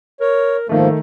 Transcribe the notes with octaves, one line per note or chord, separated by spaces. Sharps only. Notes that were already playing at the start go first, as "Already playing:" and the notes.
A#4 C#5
G#2 D#3 F3 A3 A#3 A4